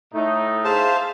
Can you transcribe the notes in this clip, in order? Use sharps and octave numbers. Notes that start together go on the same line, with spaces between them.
A2 A3 D#4
G#4 C5 E5 F5 A5